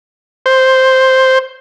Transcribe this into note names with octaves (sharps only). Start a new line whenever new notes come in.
C5